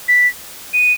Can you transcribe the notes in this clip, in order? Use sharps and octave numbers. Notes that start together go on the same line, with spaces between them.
B6
D#7